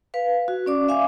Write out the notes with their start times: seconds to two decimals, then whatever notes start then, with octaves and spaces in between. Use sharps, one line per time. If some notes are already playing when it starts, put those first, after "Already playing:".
0.14 B4 F5
0.48 F#4
0.66 C#4 D5 D6
0.88 E5 F5 G#5 D6